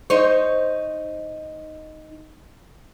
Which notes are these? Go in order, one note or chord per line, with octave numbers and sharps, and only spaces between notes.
D#4 C5 C#5